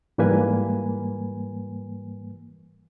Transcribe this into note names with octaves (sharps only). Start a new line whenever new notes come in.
G#2 E3 G3 A#3 B4 G#5